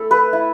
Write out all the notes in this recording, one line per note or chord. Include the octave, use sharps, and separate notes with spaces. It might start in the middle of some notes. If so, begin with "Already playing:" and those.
Already playing: A3 E4 A4
B4
E4